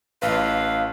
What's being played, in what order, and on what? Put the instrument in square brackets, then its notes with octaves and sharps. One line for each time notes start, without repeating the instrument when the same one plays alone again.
[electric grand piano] A1 B4 [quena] F5